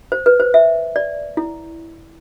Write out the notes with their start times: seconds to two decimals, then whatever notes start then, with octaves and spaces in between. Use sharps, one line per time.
0.12 C5
0.26 B4
0.40 C5
0.54 E5
0.96 D5
1.37 E4